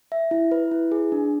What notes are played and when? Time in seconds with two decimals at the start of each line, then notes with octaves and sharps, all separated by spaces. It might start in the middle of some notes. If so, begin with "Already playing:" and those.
0.12 E5
0.31 E4
0.52 B4
0.71 E4
0.92 G#4
1.12 D4